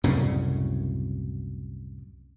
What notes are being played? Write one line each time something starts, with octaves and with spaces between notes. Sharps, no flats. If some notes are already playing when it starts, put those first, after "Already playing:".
C2 F#2 A2 C#3